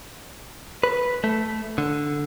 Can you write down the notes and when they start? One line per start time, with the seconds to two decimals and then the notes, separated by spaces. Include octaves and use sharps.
0.83 B4
1.24 A3
1.78 D3